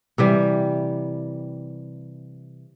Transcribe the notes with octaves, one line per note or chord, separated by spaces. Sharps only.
C3 E3 G3